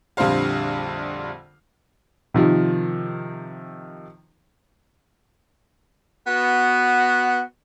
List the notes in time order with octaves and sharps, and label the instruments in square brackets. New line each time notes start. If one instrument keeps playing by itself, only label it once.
[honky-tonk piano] A#1 F2 D3 G3 C5 F5
[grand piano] C3 D#3 F3
[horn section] B3 F#4